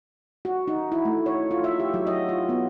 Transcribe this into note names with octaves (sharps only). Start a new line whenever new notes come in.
F#4
D#4
E4
A3
C#5
F4
E5
G4
F#3
D#5
F4
B3